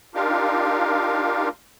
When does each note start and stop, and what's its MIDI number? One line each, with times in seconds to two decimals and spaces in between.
0.15 1.49 62
0.15 1.49 63
0.15 1.49 65
0.15 1.49 67
0.15 1.49 70
0.15 1.49 77